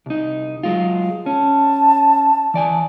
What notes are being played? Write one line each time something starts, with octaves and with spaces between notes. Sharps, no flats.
C2 D#4
F#3 G#3 F4
C#4 A5
E3 D5 G#5